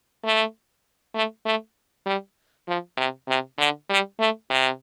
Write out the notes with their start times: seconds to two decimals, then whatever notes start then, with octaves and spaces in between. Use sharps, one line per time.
0.24 A3
1.15 A3
1.46 A3
2.06 G3
2.67 F3
2.97 C3
3.28 C3
3.58 D3
3.90 G3
4.20 A3
4.50 C3